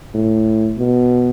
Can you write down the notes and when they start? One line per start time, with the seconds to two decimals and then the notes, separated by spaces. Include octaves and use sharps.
0.15 A2
0.78 B2